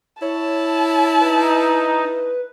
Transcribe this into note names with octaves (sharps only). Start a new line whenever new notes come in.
E4 C#5 A5
D#4 B4